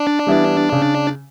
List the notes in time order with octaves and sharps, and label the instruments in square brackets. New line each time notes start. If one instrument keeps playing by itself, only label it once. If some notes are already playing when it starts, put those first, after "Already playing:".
Already playing: [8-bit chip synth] D4
[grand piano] E3 G3 B3 E4
C#3